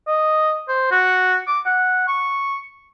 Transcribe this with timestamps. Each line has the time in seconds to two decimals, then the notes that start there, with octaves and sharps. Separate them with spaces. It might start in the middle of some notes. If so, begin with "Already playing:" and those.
0.08 D#5
0.68 C5
0.91 F#4
1.47 D6
1.66 F#5
2.08 C#6